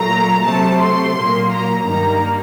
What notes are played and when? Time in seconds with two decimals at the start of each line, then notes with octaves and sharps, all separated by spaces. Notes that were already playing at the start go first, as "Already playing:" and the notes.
Already playing: A#2 F#3 A3 A#5
0.44 C3 F#3 A3 A5
0.79 C6
1.16 A#2 F#3 A#3
1.51 A#5
1.86 G2 D#3 G3 A#3 A#5